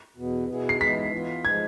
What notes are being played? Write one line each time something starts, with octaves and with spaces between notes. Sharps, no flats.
E2 B2 B3
B2 B3 E4 G#4
C7
E3 G#3 B3 E4 G#4 B6
E3 B3 F4
F3 G#3 G#6